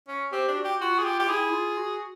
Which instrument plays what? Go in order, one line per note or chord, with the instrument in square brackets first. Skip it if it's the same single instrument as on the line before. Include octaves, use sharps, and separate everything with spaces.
[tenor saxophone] C#4
[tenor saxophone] C4 [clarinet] G4
[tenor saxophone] D4
[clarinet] F#4
[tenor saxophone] G4
[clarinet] F4 [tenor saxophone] F#4
[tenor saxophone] G#4
G4
G4
[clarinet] E4 [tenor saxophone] G#4
[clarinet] F4
F#4